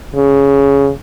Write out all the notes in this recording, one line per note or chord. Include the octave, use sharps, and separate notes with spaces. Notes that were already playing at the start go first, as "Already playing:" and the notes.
C#3